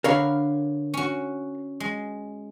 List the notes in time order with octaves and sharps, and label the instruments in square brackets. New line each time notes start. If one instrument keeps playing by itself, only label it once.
[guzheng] D3 B5 [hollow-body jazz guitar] A#4 C#5 F5
[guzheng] C#4 F#4
G#3